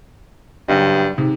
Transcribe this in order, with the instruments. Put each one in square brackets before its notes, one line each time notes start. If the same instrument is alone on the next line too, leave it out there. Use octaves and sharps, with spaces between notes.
[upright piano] F#1 F#3 D#5 [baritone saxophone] G2
[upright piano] G#2 C3 D#3